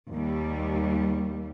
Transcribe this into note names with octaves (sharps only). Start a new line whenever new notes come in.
D#2 G3